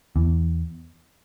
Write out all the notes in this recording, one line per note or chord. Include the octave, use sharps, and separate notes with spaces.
E2